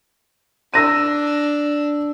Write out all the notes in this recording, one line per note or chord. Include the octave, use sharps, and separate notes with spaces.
D4 E6 A#6 D#7